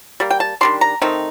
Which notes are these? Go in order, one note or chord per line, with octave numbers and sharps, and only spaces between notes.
G3 A#3
G5
A5
D#3 G3 D4 C6
A#5
D#3 A3 C4 D#4